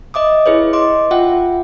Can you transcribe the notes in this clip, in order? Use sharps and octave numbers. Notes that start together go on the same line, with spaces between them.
D#5 E5 D6 D#6
E4 G#4 B4 C#5
D#5 C6 D6
F4 E5 F#5 G5